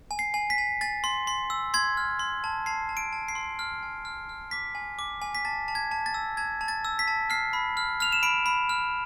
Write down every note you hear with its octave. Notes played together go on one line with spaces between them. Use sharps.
G#5
C7
G#5
B6
G#5
G#5 A6
C6
C6
E6
C6 G#6
F6
C6
A5
A5 C7
A5
D7
A5
C7
C6
F6
G#5
F6
F6
D6 B6
G#5
D6
G#5
B6
A5 A6
A5
G#6
A5
A6
E6
A5 G#6
A5
A6
E6
B6
A5
F6 C7
B5
F6
F6 F7
E7
B5 D7
B5
F6